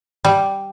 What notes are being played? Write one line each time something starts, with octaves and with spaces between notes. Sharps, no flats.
G3